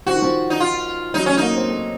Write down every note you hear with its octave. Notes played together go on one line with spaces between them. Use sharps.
F3 F#4
D#3
F3
D#4
F4
F#3 D#4
A3 C#4
A#3 D#4
C4
A3